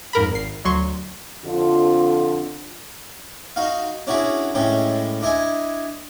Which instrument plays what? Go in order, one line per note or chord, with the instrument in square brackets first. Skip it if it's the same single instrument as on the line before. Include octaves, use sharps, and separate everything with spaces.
[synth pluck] F2 G#2 A#4 B5
G#1 C7
D2 F#3 C6 C#6
[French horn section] F2 D3 F4
[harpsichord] D#4 F#4 F5
C#4 D4 E4 F#4 G#4
A2 G#3 C#4 G4 A4
D4 E4 D#5 G#5